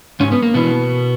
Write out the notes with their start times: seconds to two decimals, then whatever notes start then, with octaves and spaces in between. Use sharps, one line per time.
0.20 G#2 C#4
0.32 B3
0.43 A#3
0.54 B2 E3 B3